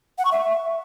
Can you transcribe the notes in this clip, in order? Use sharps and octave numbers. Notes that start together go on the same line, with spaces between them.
F#5
C#6
E5